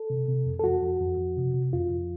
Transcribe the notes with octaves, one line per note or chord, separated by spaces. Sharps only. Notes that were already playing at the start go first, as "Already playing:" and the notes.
Already playing: A4
C3
C3
F2
A4
F2 F#4
F2
F2
F2
C3
C3
F2 F4
F2